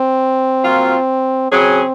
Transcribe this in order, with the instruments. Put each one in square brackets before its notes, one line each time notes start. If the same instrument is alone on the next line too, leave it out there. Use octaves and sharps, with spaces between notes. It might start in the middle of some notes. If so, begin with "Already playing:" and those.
Already playing: [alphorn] C4
[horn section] F#3 A#3 F4
[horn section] C#3 F#3 C#4 G#4 [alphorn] C4